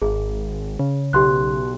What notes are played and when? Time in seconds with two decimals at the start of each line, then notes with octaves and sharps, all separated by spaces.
0.02 G#1 G#4
0.79 C#3
1.13 B1 G4 C6 F#6